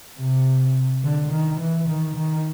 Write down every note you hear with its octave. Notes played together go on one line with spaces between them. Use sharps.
C3
D3
D#3
E3
D#3
D#3